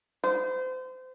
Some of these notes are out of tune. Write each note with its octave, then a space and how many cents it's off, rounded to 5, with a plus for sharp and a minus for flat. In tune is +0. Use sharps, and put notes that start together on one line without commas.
C5 -30